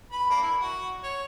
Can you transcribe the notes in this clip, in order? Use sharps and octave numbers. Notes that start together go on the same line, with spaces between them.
B4 B5
A#3 D4
E4
F#4
C#5